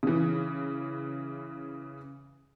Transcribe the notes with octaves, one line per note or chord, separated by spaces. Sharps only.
C#3 E3